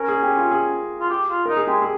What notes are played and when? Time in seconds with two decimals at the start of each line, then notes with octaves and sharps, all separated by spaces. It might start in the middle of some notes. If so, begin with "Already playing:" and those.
Already playing: C#4 A#4
0.09 G#4
0.23 G4
0.37 F4
0.51 G#4
1.00 F4
1.10 G4
1.30 F4
1.46 D#4 A#4
1.57 G#4
1.67 G#3 G4
1.82 G#4